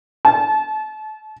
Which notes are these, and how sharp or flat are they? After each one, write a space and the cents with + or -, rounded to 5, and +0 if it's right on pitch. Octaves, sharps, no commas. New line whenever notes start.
A5 -30